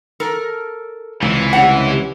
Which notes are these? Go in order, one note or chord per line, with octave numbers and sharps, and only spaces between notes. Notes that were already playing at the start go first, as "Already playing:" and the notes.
A4 A#4
C#2 C3 E3
G3 C#4 G4 F#5